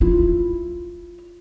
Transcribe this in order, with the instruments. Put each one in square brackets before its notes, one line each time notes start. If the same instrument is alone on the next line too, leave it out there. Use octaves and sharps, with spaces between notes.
[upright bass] E4 F4